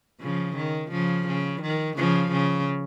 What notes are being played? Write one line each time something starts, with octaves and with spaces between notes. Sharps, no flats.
C#3 F3
D#3
C#3 F3
C#3
D#3
C#3 F3
C#3